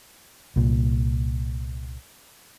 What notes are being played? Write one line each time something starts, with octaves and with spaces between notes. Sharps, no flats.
C2 A#2